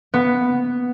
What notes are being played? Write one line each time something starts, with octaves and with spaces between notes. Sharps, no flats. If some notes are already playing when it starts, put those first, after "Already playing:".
B3